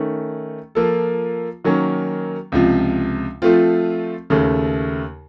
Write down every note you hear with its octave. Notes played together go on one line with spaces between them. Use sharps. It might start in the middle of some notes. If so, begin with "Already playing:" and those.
Already playing: D#3 A3 C#4
F3 A#3 F4 A4
D#3 F#3 A#3 C#4
C#2 C3 F3
F3 A3 C4 F4
D#2 C#3 A3